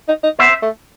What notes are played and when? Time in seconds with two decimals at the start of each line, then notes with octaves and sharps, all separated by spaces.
0.08 D#4
0.24 D#4
0.39 B3 C5 E5
0.63 A3